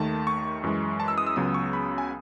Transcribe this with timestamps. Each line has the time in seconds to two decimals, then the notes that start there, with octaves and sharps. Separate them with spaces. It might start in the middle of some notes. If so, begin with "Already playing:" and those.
Already playing: D#2 D#3 A3 A5
0.27 C#6
0.63 F#2 E3 G#3
1.00 A5
1.08 E6
1.18 D#6
1.27 E6
1.36 C#2 C#3 F#3 B3 D#6
1.54 C#6
1.73 B5
1.98 G#5